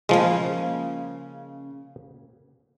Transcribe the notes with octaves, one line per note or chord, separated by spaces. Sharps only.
C#3 F3 G#3 A#3